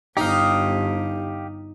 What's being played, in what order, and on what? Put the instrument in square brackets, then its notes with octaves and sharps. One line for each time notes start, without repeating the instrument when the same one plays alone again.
[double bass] G1 [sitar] D#4 [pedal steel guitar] G4 F5